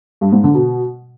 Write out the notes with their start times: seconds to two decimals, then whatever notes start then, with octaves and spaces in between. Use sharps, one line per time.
0.21 G2
0.32 G#2
0.43 D3
0.55 B2